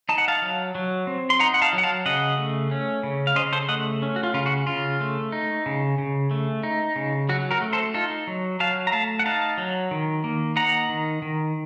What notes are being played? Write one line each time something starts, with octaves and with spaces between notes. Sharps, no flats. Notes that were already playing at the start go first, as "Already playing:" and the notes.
D#4 A5
F#5
F5 A5
F#3
F#3
C4
C6
D#4 F#5 A#5
F#5
F5 A5
F#3
F#5
F5 A5
C#3 D#5 F#5
A3
C#4
C#3
F5
C#3 C5 D#5
A4 C5
A3 D#5 F#5
C#4
F#4
F4
C#3 F4
F#4
C#3 F4
A3
D#4
C#3
C#3
A3
D#4
C#3
F#3 F#4
F#4 A#4
A3
A4 C5
D#4 F4 A4
F#3
F#3 F5 A5
A#5
A3 F5 A5
F#5
D#4 F5 A5
F#3
D#3
A#3
D#4 F#5 A#5
D#3
D#3